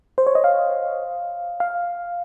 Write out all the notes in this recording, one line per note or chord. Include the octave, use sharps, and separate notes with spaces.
C5
C#5
D#5
F5
F5